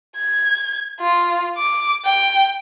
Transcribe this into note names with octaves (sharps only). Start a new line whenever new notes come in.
G#6
F4
D6
G5